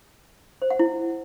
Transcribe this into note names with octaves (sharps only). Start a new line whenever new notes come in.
C5
F#5
E4